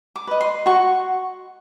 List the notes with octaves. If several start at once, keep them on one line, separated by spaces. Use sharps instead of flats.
D6
B4 D#5
C6
F#4 C#6